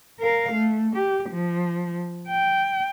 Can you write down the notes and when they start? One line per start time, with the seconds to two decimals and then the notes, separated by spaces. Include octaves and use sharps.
0.19 A#4 F5
0.52 A3
0.96 G4
1.30 F3
2.29 G5